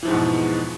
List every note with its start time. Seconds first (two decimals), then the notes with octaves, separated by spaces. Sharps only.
0.03 E3
0.05 F3
0.08 G#2
0.11 E2
0.13 B2